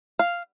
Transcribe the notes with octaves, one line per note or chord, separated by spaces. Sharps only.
F5